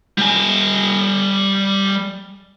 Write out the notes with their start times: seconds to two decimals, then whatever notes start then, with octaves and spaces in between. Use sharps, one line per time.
0.18 G3 G#5